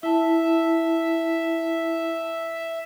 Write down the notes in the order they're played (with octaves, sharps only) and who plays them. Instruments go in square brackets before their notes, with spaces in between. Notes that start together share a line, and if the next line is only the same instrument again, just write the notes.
[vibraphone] E4 A5 [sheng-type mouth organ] E5